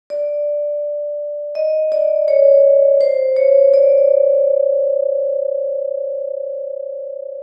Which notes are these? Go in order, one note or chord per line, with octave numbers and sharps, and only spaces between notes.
D5
D#5
D5
C#5
C5
C#5
D5